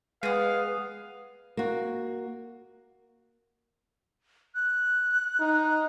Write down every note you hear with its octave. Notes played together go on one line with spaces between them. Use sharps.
G#3 B3 G#4 B4 F5
A#3 F#4
F#6
D#4